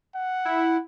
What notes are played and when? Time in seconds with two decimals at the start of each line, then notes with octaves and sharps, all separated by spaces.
0.15 F#5
0.45 E4